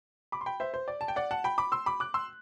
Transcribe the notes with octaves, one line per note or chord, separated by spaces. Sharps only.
B5 D6
C6
G5 B5
C5 E5
C5
D5
A5
G5
D5 F#5
F#5 A5
G5 B5
B5 D6
C6 E6
B5 D6
D6 F#6
C6 E6